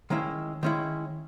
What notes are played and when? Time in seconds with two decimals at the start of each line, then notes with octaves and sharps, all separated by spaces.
0.10 D#3 G#3 C#4 E4
0.63 D#3 G#3 C#4 E4